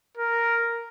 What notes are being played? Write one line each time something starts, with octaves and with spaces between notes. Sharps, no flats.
A#4